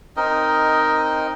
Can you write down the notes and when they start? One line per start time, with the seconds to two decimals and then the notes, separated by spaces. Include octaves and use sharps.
0.17 C4 D#4 A#4 D#5